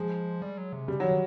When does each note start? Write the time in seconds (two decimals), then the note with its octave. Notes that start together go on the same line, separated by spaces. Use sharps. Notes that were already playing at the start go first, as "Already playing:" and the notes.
Already playing: F3 G#3
0.42 G3
0.58 F#3
0.73 C3
0.88 C#3 G3
1.00 D#3 F#3
1.11 D#3